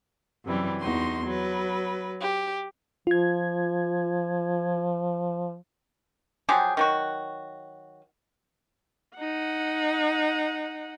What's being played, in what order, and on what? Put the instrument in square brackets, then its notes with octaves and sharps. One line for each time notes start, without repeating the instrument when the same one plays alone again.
[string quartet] F#2 C3 E3 G3
E2 D#4 F#4 C6
F#3 B4
G4
[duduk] F3 [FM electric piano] F4 G#6
[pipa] F3 F#3 G4 G#4
D#3 F#3 F#4
[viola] D#4 F#5